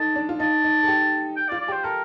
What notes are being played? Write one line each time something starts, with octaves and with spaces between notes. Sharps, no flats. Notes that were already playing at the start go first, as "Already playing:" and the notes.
Already playing: D#4 A4 A5
D4
F4
D#4 A5
D#4
A4
G4
G5
D5
F4
D5
G4 C5
A4 A#4